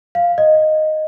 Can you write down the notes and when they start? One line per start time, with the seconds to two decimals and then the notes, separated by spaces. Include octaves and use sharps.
0.15 F5
0.38 D#5